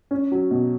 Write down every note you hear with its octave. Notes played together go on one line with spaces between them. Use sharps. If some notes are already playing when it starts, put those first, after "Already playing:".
C#4
F#3
B2